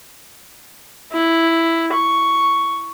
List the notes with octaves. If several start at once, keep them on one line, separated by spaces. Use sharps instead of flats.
E4
C#6